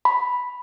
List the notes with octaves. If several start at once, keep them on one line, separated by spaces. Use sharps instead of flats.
B5